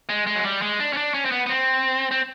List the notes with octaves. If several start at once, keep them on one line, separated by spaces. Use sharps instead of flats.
G#3
G#3
F#3
G3
G#3
D4
C#4
D4
C#4
C4
B3
B3
C4
C4